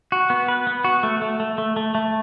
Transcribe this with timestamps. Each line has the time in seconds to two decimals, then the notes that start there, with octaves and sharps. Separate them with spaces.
0.12 F#4
0.30 B3
0.48 B4
0.67 B3
0.84 F#4
1.03 A3
1.22 A3
1.40 A3
1.58 A3
1.76 A3
1.95 A3